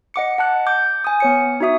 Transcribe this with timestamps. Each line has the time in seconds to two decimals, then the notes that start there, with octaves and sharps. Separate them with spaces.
0.14 D#5 F#5 D6 C#7
0.38 F#5 A5 F#6
0.67 D6 G6
1.04 G#5 D#6
1.20 B3 C#5 C#7
1.60 D#4 F#4 E5 D#6